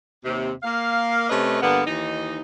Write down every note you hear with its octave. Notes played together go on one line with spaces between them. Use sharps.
D#2 C3
A#3 F5
C3 A3 C#4 B4 D#5
G2 D3 A#3 B3
D#2 E3 D#4